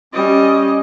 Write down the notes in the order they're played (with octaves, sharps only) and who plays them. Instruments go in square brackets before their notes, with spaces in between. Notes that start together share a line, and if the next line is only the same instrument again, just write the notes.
[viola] G3 D#5 [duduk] C#4